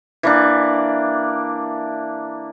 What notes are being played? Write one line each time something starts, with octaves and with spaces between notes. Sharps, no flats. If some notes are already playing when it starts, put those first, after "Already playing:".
E3 A#3 D4